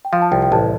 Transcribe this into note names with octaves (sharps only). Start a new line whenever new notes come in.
G5
F3 F5
A5
C2 G5
G5
A1 A5